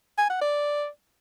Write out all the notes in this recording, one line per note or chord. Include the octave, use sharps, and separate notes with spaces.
G#5
F#5
D5